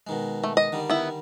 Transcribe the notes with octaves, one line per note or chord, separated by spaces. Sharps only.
B2 D#3 G#3
A3
D#5
D3 D#3 G3
B3 E4